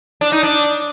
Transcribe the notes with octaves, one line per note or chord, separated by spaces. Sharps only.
D4
D#4
D4